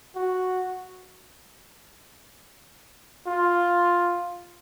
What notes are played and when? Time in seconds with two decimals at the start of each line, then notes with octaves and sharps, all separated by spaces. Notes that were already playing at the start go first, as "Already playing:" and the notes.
0.16 F#4
3.27 F4